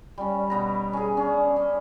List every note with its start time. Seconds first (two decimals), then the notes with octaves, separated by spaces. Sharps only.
0.18 G3 C#4
0.50 B2 B3 A#5
0.93 C#4 G#4
1.17 C#4 D4
1.56 C#4